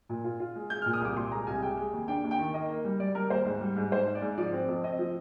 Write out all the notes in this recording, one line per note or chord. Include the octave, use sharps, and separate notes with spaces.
A#2
F4
F4
G#3
G#3 G6
F6
A#2
D#6
C2 D6
A#2 C6
G#3 A#5
C2 G#5
G#3 G5
G#3
D#2
D4 G5
D#2
G5
D#3
A#3 D#5
A#3
G3
G3 D5
G3 A#4
D#2 C5
G#2
G3
G#2
G#2 C5
G#2
D5
G#2
F3 D5
C4
F2
C4 D#5
F3